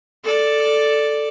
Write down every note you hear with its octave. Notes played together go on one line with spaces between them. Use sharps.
A4 D5